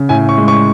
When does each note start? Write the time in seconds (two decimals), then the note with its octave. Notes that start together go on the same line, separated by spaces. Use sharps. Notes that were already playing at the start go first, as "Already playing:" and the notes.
Already playing: C#3
0.09 A2 G#5
0.29 C#6
0.38 G#3
0.48 C#6